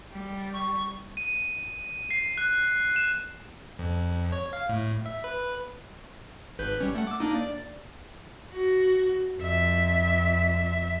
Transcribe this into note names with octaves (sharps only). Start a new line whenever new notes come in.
G3
C#6
D#7
C7
F#6
E7
F2
C#5
F5
A2
E5
B4
G#1 B4 G6
G3 C#4
A3 F#5
D6 E6
A#3 D4 D#4
D5
F#4
F2 E5